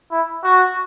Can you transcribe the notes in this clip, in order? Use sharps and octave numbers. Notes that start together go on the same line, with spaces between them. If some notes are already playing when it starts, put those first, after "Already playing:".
E4
F#4